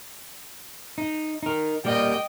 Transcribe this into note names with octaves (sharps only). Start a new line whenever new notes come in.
D#4
D#4 A#4
G3 A#3 D5 D#5 G5